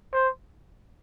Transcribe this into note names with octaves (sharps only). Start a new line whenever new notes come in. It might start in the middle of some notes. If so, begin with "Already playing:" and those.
C5